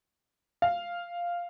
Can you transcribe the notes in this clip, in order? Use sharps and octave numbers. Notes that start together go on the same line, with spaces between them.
F5